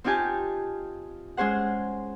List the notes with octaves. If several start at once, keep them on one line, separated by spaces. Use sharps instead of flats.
C4 D#4 F4 G4 G#5 A5
G#3 C#4 G#4 C5 F#5